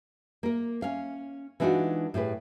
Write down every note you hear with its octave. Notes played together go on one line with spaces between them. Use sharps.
A#3 A#4
C#4 F5
E3 G#3 D4 D#4 F4 F#4
A2 G4 G#4 B4